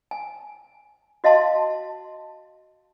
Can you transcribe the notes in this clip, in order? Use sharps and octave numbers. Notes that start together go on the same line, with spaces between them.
G#5
F#4 D#5 F5 A5 C6